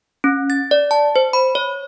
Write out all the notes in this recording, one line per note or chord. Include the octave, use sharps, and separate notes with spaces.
C#4
A6
D5
A5
C5
B5
C#5